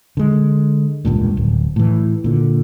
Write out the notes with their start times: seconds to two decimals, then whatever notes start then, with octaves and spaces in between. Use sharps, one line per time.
0.17 D3 G#3
1.05 E1 C#2 G2 A#2
1.37 D1
1.76 A2 E3
2.24 A#2 D3